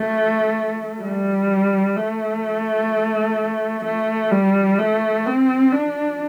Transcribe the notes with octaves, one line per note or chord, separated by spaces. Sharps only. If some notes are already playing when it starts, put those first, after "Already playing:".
Already playing: A3
G3
A3
A3
G3
A3
C4
D4